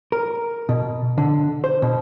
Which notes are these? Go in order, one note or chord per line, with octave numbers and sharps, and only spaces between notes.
A#4
B2
D3
C5
B2